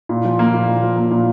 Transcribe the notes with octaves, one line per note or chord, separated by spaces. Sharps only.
A#2
F3
A#3
A#2
A#2
F3
A#3
A#2